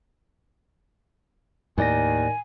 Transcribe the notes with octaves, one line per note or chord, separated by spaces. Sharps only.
D#2 A2 D#3 D5 G#5 A#6